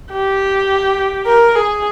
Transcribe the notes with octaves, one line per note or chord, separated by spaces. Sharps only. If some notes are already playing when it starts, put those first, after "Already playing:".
G4
A#4
G#4